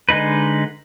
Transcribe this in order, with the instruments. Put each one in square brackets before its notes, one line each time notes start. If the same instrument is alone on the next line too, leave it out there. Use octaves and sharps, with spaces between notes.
[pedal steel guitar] D3 G#3 D#4 B4